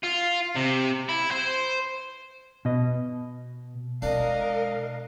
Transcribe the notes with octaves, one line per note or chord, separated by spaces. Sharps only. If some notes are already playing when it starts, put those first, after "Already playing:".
F4
C3
E4
C5
B2 D#5
B2 G#3 D4 A#4 D#5 F5